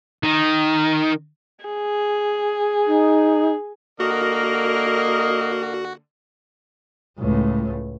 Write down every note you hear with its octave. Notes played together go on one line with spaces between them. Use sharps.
D#3
G#4
D#4
D3 A#3 F#4 A#4 D#5
C#2 A2